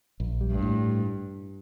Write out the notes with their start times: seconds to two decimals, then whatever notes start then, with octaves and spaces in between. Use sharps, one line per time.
0.20 A#1
0.41 G3
0.52 G2
0.62 A2